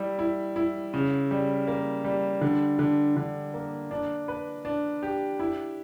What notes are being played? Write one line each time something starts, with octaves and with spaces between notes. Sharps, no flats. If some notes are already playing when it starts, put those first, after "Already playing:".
Already playing: G3 E4
E4
E4
C#3
G3
A#3
G3
D3
D3
D3
A#3
D4
B4
D4
G4
E4